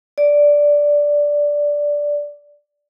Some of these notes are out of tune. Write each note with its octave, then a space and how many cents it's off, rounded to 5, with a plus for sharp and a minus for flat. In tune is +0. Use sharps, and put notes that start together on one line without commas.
D5 -5